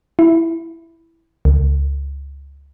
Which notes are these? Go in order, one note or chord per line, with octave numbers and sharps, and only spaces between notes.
E4
C#2